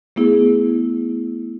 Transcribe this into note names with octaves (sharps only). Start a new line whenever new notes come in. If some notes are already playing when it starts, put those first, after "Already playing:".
A3 B3 E4 G#4